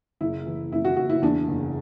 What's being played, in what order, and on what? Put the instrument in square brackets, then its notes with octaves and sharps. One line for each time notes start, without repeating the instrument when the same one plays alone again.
[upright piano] F#1 E4
E3
F#2 E4
F#4
F#1 F#4
E4
E2 D4
F#1